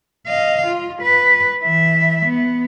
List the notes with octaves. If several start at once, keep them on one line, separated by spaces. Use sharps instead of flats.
D#5 F5
F4
B4
E3 E5
B3